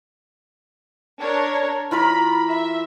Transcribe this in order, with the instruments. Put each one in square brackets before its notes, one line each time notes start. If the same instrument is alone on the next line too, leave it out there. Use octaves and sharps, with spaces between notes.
[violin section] D4 A#4 C#5
[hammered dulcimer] E3 F4 A#4 [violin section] B5
[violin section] E5